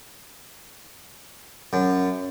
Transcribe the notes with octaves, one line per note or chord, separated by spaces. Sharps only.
F#2